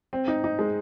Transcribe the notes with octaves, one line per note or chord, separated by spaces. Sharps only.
C4
D#4
D#4
G#3